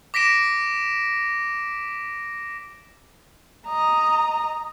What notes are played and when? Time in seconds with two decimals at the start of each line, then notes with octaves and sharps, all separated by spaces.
0.14 D6 A#6 B6 D7 E7
3.67 D#5 A#5